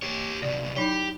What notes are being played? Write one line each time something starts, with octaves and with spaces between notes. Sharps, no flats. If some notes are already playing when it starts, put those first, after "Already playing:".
G4 C#5
C2 B2 D5
F#3 D#4 E4 G4